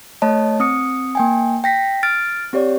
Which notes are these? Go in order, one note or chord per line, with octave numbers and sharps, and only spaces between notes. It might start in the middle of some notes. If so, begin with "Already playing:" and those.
A3 C#5 D#5 A5
C4 D#6 C#7
A#3 G5 G#5
G5 A#6 B6
F6 A6 D7
C4 G4 C#5 D5